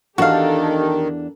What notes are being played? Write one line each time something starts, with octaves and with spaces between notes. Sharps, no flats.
E2 D#3 D4 F#4 G4 A4 A#4 F5